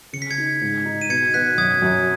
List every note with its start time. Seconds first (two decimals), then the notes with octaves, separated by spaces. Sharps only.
0.13 C#3 C#7
0.22 B6
0.31 G#6 C#7
0.38 D#4
0.61 G#2
0.85 D#4
1.01 D#7
1.09 B2 G#6 C#7
1.34 B2 F#6 B6
1.58 F#2 D#6 G#6
1.82 F#2